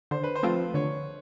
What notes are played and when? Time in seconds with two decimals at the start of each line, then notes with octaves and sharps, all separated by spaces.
0.11 D3 C5
0.23 B4
0.36 C5
0.43 F3 A3 C4 F4
0.74 D3 C#5